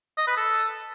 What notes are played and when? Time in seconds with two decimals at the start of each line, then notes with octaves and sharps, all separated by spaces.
0.17 D#5
0.27 B4
0.37 A4